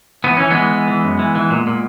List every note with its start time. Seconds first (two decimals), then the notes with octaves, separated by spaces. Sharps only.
0.24 E3 B3
0.37 E3 C#4
0.51 E3 G#3 B3
0.71 E3
0.88 E3
1.03 F#2
1.19 E3
1.35 E3
1.50 A#2
1.67 A#2